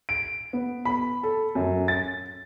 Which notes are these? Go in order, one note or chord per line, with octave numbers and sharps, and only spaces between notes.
D7
B3
B5
A4
F#2
A6